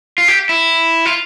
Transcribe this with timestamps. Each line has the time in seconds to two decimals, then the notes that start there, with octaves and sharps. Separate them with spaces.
0.18 F4
0.28 G4
0.49 E4
1.05 F4